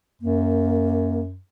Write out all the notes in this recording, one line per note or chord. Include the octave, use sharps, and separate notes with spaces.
F#2 A#3